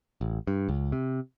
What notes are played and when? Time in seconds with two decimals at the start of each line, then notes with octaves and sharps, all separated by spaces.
0.21 A1
0.47 G2
0.69 C#2
0.92 C3